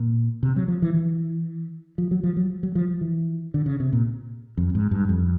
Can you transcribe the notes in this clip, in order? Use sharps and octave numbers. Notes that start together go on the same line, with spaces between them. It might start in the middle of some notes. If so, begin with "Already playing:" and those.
Already playing: A#2
C3
F#3
F3
E3
E3
F3
F#3
F3
F#3
F#3
F3
E3
D3
C#3
C3
A#2
F2
G#2
G2
F2